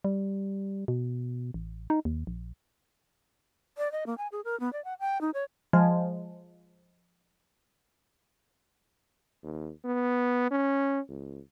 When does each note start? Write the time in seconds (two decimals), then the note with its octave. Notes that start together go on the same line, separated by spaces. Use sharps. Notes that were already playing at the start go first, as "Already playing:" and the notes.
0.05 G3
0.88 B2
1.54 A1
1.90 D#4
2.05 D#2
2.27 A#1
3.78 D5
3.92 D#5
4.07 A#3
4.18 G#5
4.32 G#4
4.45 A#4
4.60 B3
4.73 D5
4.85 F#5
5.00 G5
5.21 D#4
5.34 C#5
5.73 F3 G#3
9.43 D#2
9.85 B3
10.51 C#4
11.09 C#2